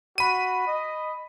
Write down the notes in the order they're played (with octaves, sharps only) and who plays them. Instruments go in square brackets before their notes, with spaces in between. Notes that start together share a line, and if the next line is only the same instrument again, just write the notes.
[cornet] F#4 [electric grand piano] B5 D#7
[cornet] D#5